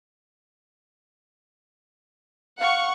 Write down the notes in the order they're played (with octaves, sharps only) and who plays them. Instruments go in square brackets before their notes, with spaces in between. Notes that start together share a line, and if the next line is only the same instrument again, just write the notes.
[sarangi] F5 [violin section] F#5 C#6